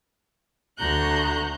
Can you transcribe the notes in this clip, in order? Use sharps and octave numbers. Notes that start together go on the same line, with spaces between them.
D2 F#4 A#5 F#6 G6